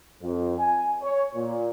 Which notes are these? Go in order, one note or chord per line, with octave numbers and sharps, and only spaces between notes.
F2
G#5
C#5
A#2